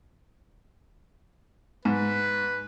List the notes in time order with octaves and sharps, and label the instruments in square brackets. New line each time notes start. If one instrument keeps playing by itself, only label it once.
[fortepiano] G#2 [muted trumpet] B4